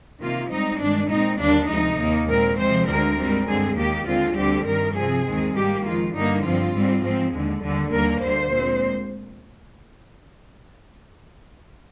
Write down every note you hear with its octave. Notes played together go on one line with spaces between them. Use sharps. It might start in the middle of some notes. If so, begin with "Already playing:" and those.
C3 D#3 A#3 F4
G#2 G3 C4 D#4
G2 D#3 G#3 D4
A#2 G#3 C4 D#4
D#2 D3 G3 A#3 D4
D2 C3 F3 G#3 D#4
D#2 D#3 A#3
A#2 G#3 C4 A#4
C3 F3 G#3 C4 C5
D2 D3 G#3 C4 A#4
G#2 G3 C4
G2 D3 G#3 C4 G#4
D#2 D#3 A#3 G4
D#2 D3 G#3 C4 F4
D2 D3 G3 C4 G4
G2 D#3 G3 A#4
C3 F3 C4 G#4
D#2 D#3 G#3 C4
G#2 G3 A#3 G4
F2 D#3 G#3 F4
G2 D3 G3 A#3 D#4
G2 F3 C4 F4
G#2 G3 C4
G#2 F3 C4
D#2 D3 G#3
D#2 D3 G3
D#2 D3 G3 A#3 A#4
D2 D3 G3 C5
A#2 G#3 C4